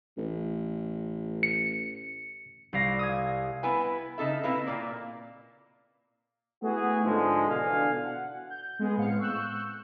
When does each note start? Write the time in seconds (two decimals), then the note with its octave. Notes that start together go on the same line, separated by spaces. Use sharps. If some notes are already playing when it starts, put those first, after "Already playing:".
0.18 A1
1.43 C#7
2.73 C2 D5 F5 A#6
2.99 D#6 G#6
3.63 B3 E4 B4 G#5
4.18 C#3 D#4 A4 E5
4.43 B2 C4 E4 B4 F5
4.67 A#2 A#3 D5
6.63 A3 B3 E4 F#4 G#4
7.04 G#2 D3 F3 G#3
7.50 B2 D3 E3 D4 F5 G#5
8.05 F#5
8.50 G6
8.79 G#3 B3 G#4
8.97 A2 G#3 B3 C4 F5 C#7
9.19 C#6 E6 F#6 G6 E7